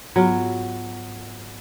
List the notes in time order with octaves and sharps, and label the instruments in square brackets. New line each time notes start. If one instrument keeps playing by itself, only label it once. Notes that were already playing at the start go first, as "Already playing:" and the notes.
[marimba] G#2 B3 F4 [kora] F#3